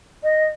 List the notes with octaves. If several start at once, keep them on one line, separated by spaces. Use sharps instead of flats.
D#5